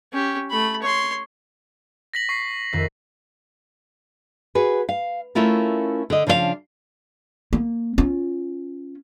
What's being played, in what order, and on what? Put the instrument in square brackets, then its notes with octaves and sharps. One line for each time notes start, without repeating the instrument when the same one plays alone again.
[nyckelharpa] C#4 G4
A3 B5
C#5 C6
[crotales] A#6 B6 F#7
C#6 B6 C7
[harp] F2 D#3 E5
[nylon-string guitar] F#4 G#4 B4
F5
A3 C#4 E4 F4 A#4
D3 D#5
C#3 F3 D4 C#5 F5
[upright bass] A#3
C#4 F4